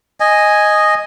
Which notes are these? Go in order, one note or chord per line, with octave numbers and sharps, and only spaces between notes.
D#5 G#5